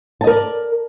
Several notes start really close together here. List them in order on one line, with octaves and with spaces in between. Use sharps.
A5 D#5 A#4 D5